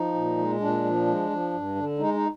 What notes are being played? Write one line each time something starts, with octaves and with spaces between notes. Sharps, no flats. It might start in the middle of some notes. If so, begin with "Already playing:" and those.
Already playing: F3 D#4
A#2
G#3
A#2 D4
F3
G#3
F3
G2
D3
G#3 D#4
D#4